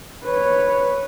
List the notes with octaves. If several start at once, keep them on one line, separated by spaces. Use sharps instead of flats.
B4 C#5